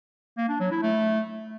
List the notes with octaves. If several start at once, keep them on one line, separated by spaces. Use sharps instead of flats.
A#3
D4
F#3
E4
A3